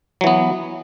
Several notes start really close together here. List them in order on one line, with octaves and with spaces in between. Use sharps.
F#3 E3 B3